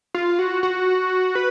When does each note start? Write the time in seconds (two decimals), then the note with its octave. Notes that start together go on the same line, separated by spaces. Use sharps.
0.14 F4
0.39 F#4
0.63 F#4
1.35 B4